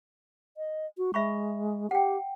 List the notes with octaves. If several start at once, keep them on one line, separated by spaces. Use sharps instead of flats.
D#5
F#4
G#3 E5 B5 C#6
G4 F#5 G5